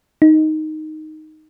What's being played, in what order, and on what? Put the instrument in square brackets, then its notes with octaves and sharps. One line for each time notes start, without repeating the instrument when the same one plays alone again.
[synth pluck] D#4